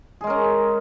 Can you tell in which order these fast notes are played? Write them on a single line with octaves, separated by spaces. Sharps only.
G#4 G#3 A#4 C#4